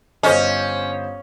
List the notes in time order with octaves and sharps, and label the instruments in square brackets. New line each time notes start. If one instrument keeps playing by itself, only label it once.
[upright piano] G1 C5 D#5 [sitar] C#4